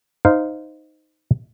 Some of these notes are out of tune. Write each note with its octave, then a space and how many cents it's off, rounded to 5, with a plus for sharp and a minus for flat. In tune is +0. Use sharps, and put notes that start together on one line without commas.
D#4 +0 C5 -15 F5 +0